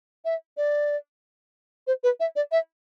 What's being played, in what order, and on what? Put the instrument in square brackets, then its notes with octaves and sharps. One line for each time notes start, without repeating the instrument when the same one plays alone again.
[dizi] E5
D5
C5
B4
E5
D5
E5